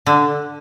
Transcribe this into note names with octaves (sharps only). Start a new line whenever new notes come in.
D3